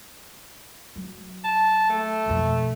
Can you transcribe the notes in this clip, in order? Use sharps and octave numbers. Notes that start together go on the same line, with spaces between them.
F#3
A5
A3
B1 F2